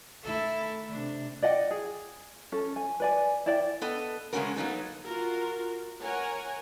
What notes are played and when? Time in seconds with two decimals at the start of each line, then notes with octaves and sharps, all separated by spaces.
0.23 D#3 A3 E4 A4
0.90 C3 A3 D4
1.43 D5 D#5 F#5 G5
1.71 G#4
2.52 C#4 A4
2.76 G#5
3.00 B4 D5 G#5
3.46 E4 D5 G5
3.81 B3 A4 D#5
4.33 C#3 G#3 A3 C#4 F#4 A#4
4.56 F#3 A#3 B3 D#4 A4
5.06 F4 F#4 A#4
6.02 A#4 C#5 F#5 G#5